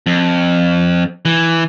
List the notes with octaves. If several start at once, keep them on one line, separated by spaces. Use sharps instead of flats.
F2
E3